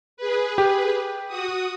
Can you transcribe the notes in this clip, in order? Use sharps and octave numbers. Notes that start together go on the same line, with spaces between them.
G#4 B4
G4
F#4 D#6